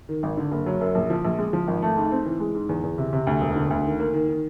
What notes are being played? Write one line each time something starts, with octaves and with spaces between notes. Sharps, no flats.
D#3
G#1
D3
F#1
F#3
F#2
A#1
F3
A#1
G#3
F3
G#1
A3
G#2
C4
E3
G#3
G#2
E2
E2
C3
C3
D2
E1
D3
D2
D#3
A#3
D#3
D#3